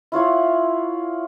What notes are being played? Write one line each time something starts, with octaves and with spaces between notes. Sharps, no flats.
E4 F4 C#5 F#5